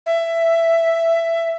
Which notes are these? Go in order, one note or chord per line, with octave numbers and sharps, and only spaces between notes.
E5